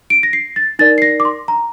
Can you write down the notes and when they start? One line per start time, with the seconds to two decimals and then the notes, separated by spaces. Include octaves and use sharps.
0.10 D7
0.23 A#6
0.33 C7
0.56 A6
0.79 D#4 A#4 D5 A6
0.98 C7
1.02 A#6
1.20 D6
1.25 C6
1.48 A#5